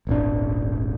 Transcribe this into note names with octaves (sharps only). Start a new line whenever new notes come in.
D#1 G#1 D4